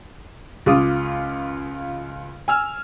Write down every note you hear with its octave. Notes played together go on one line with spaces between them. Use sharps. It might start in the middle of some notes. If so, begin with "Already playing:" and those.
C#2 F4 D6 D#6
G#5 E6 F6